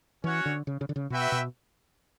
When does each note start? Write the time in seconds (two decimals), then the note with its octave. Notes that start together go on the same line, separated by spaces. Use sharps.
0.23 E3 C#4 F#4 C#5 F#5
0.46 D3
0.67 C#3
0.81 C#3
0.89 D3
0.96 C#3
1.10 B2 F#4 B4 E5 G5
1.32 B2